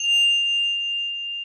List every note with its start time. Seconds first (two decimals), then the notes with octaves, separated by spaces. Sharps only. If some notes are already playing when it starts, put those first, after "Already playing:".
Already playing: F7